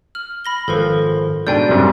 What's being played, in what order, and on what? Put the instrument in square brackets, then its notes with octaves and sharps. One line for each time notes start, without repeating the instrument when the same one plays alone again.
[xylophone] F6 F#7
B5 A#6 G7
[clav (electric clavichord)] G#1 F3 [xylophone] A4 B4
[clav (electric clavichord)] G#2 B2 D4 [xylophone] D5 G5 G#5 [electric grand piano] G6
[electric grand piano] F#2 C3 G3